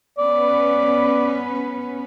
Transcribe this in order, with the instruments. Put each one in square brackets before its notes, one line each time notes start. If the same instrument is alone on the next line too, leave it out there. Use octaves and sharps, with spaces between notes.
[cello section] B3 C#4 B4 [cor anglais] D5